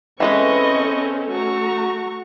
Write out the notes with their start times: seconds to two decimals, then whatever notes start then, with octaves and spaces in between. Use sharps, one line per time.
0.20 E3 G#3 C4 C#4 A4 B4 D#5 C#6
1.29 A3 F#4 A#5 C#6